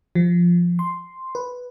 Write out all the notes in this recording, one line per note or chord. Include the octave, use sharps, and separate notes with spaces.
F3
C6
B4